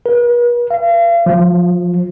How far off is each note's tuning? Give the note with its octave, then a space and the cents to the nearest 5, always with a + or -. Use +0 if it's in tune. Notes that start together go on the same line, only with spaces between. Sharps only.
B4 -45
F5 -40
F3 +20